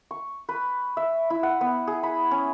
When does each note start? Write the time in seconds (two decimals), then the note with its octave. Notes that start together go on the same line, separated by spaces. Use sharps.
0.11 C#6
0.49 B4
0.97 E5
1.30 E4
1.43 F#5
1.61 B3
1.87 G#4
2.03 B5
2.31 C#4